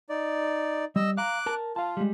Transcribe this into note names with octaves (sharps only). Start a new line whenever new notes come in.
D#4 D5
G3 D#5 E6
F5 A#5 D6 F#6
A#4 A5
F4 F5 A5
G3 G#3